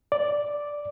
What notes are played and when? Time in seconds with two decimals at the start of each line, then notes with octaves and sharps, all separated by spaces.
0.12 D5